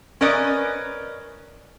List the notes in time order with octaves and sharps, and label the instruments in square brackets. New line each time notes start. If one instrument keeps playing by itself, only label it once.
[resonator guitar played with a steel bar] C#4 A#4 B4 D5 D#5